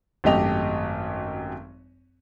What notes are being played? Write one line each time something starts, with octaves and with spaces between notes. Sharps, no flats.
G#1 F#2 A3 G4 D#5 F7